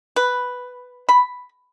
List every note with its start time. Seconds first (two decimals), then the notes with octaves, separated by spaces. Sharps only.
0.16 B4
1.09 B5